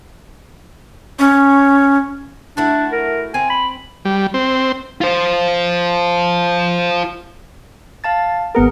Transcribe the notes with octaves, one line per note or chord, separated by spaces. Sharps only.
C#4
A3 D4 E4 F#4
A#4
C4 G#5
B5
G3
C4
F4 C5
F5 A5 A6
G#1 B3 G#4 A#4 F#5